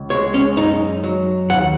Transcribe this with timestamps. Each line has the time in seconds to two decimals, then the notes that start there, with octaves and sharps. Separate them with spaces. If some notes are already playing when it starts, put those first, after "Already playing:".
Already playing: C#2
0.10 G#3 C#5
0.34 C#4
0.57 F#2 D#4
1.04 F#3
1.50 D#2 F#5